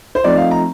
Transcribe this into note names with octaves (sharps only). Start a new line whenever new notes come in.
C5
F3 A3 C4 D#4 D5
F5
A#5